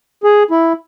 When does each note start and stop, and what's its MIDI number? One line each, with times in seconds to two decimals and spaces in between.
0.24 0.43 68
0.51 0.73 64